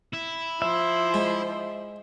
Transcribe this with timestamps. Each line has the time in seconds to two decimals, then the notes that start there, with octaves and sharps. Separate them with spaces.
0.13 E4
0.62 F3 C5 E5
1.14 G#3